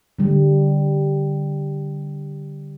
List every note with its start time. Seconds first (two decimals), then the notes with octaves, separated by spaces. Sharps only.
0.19 D3 G3